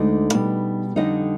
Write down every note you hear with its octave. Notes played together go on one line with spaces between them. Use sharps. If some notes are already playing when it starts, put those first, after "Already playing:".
Already playing: D2 D3 G#3 D#4 D#5
B2 G3 B3
F2 D3 G3 D#4 D#5